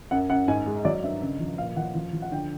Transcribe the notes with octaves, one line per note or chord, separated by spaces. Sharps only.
F#2 F#5
F#2 F#5
G#2 G#5
G#3
F#3 D5
G2 E5
C#3
F3
A#2 F5
F3 F#5
F3
F3
F#5
D3 G5